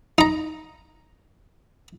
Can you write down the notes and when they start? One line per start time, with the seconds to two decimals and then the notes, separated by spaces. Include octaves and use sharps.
0.18 D#4 A#5